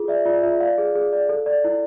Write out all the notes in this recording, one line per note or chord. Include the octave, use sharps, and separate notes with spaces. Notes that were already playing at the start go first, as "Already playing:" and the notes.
Already playing: F4 G#4
D5 E5
F4 D5
F4 E5
D5 F5
G#4
G#4
D5
A4
D5
E4